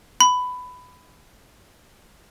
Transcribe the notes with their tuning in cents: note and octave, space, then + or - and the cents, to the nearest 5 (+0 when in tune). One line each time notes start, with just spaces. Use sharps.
B5 +15